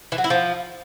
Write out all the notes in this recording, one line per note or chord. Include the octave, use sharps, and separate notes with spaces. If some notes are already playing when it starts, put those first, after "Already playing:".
E3
F#3
E4
F3